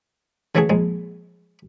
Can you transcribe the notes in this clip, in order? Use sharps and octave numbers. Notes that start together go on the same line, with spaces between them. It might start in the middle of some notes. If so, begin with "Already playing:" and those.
C#3 E3 A3 E4 F#4 G#4
A#1 G#3